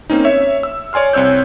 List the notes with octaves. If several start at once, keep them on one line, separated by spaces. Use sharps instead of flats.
A#3 C4 C#4 D#4
C#5 E5
E6
C#5 D5 G#5 C6 F6
C2 C4 C#5 E6 G6